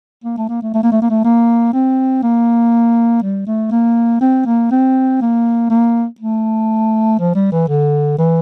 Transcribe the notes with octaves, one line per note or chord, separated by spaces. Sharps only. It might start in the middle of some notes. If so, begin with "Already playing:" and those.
A#3
A3
A#3
A3
A3
A#3
A3
A#3
A3
A#3
C4
A#3
G3
A3
A#3
C4
A#3
C4
A#3
A#3
A3
F3
G3
E3
D3
E3